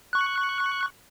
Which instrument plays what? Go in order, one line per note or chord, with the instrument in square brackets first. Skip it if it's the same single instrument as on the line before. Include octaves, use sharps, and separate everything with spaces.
[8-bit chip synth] C#6 F#6